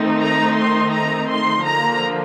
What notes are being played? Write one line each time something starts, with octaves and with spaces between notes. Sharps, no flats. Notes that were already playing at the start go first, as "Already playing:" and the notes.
Already playing: D#3 A3 C4 D#4
A#5
C6
A#5
C6
D3 F3 A#3 A#5